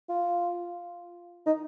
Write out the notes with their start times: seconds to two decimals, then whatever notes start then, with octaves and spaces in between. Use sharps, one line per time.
0.09 F4
1.46 D#4